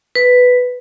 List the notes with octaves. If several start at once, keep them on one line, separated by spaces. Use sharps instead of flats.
B4